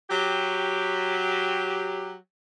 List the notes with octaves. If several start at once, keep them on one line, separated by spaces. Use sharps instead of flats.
F#3 G4